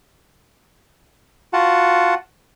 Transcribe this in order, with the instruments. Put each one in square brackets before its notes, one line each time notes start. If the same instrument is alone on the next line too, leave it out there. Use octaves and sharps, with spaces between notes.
[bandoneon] F4 F#4 F#5 A5